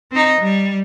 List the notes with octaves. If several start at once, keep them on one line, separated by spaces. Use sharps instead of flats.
C4 D#4
G3